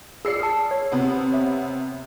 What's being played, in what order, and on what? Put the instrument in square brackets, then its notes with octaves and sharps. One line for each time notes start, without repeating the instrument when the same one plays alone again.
[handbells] G#4 D5 [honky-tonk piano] E6 C7 C#7
[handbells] A5 D#6 F6
C#5
[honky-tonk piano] C3 B3
[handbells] C#5 E5